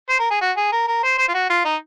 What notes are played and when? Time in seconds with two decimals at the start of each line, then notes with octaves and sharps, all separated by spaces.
0.09 C5
0.20 A#4
0.31 G#4
0.41 F#4
0.57 G#4
0.72 A#4
0.88 A#4
1.03 C5
1.18 C5
1.28 F4
1.34 F#4
1.50 F4
1.65 D#4